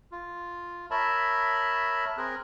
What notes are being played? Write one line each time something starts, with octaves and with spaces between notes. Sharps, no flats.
F4
A#4 C#5 E5 A5 B5
C4 G#4 A#4 F#6